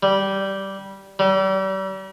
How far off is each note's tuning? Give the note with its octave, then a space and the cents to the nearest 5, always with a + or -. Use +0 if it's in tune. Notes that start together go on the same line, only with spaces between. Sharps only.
G3 -10
G3 -35